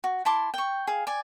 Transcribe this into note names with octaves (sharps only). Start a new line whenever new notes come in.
F#4
E4 A5 C6 D6
G5 C#6
G#4 F5
D5 G#5